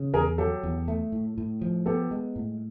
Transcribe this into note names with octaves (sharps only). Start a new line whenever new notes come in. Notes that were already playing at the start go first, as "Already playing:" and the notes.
Already playing: C#3
E2 G#4 A#4
F#3 G4 A4
E2
A3
A2
A2
F3
B3 G4 A4
G#3
A2